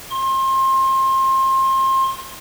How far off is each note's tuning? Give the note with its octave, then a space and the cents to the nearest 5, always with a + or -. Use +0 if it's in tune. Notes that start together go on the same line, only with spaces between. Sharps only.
C6 +30